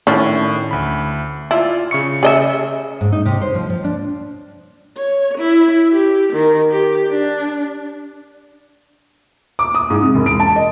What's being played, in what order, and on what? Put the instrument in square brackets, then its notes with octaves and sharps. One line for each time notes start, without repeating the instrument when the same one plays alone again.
[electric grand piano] A2 D#3 [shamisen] C#4 D4
[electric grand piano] D2 B5
[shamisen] E4 [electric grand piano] F4 D5
[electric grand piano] C#3 C#6 C#7
[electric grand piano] C#3 [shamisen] G#4 D#5 E5
[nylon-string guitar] G#2
D#4
C3
C5
F3
F3
D4
[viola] C#5
E4
G4
D#3
G4
D4
[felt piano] D6
D#6
G#2
C3
E1
D7
A5
D#5